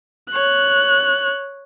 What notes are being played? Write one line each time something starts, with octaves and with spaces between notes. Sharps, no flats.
C#5 F#6